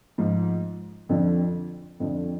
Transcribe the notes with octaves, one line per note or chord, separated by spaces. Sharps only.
G#2 F3
F2 D3 F3
F2 D3 F3